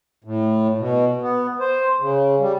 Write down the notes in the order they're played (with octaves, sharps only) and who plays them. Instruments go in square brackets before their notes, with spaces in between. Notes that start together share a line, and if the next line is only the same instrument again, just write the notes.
[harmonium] A2
B2
B3
C5
C#3
G3